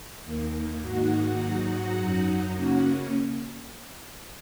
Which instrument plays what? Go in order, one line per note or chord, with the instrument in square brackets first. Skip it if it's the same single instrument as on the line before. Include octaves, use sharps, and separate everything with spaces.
[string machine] D#2 D#3 A#3
G#2 D#3 A#3 D#4 F#4 F#5
G#2 F#3 D#4
F#2 F#3 D#4
C#3 A#3 C#4 F#4 F#5